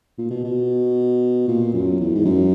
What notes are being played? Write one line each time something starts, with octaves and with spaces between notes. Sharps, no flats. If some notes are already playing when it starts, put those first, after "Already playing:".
A#2
B2
B2
A#2
F#2
E2
G#2
F#2